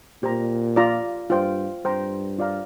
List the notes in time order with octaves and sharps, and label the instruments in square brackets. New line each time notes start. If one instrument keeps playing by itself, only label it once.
[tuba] A#2 [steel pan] G4 C5 A#5
[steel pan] F4 D5 A#5
[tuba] G2 [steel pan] F4 C5 G5
[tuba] G2 [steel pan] C5 G5 A#5
[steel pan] F4 D5 F5 A#5